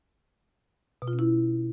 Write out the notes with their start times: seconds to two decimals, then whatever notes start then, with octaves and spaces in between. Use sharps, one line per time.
1.02 B2
1.08 F4
1.13 C#4
1.19 E4